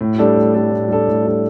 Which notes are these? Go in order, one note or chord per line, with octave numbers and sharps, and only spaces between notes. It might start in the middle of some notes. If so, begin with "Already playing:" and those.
A2
G3 D4 A4
A2
G3 D4 A4
A2
G3 D4 A4
A2
G3 D4 A4